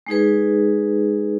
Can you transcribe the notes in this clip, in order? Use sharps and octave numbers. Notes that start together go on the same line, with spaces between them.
G#3 D#4 G#4 B4